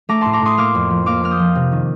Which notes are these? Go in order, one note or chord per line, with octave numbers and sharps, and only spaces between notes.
A3 A#5 D6
A2 A5 C6
A#5 D6
A2 C6 D#6
A#3 D6 F6
F2
F3
A#3 D6 F6
A#3 F6
D#6 G6
F3
C3
D#3